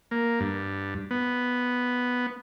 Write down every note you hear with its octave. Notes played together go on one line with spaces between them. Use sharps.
A#3
G2
B3